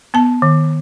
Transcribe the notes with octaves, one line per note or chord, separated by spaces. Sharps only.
B3 A5
D#3